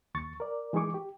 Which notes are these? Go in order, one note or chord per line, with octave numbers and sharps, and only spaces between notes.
D#2 C#6 A6
A#4 D5
E3 G#3 D#4 G#4 C#6 D6
G4